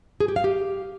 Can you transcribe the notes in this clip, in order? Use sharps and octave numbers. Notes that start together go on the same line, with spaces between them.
G#4
G4
F5
G4